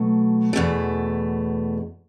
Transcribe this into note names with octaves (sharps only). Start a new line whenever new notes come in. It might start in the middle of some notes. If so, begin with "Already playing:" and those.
Already playing: B2 F#3 A3
E2 B2 A3